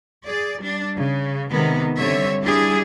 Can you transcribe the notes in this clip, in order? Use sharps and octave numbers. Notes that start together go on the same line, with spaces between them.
G#4 D5
G3 D4
C#3
C3 D#3 G#3 B3
G2 D3 G3 C4 C#5 E5
G3 D4 E4 G4 G#4